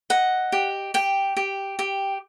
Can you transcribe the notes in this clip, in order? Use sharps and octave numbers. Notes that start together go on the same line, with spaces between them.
D#5 F#5
G4
G4 G5
G4
G4